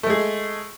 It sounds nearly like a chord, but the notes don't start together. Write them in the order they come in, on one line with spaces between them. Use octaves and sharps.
A3 G#3 G#4